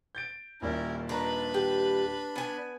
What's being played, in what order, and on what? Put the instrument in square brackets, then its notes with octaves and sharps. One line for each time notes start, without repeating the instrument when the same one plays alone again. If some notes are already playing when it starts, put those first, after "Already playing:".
[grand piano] G6 A6 D7
[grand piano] D#1 D#2 D5 [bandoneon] C#4 E4 [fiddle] A#4
[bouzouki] D#3 A#5 [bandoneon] D4 B5 [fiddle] B4
[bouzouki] G4
B3 G#5